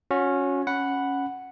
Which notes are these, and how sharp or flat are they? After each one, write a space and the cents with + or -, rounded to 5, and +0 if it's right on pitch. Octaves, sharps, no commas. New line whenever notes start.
C#4 +0 F#4 -30
C#4 +0 F#5 +0 B5 +0